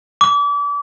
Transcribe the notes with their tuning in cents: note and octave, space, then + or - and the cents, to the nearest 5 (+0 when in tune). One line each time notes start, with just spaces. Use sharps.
D6 -35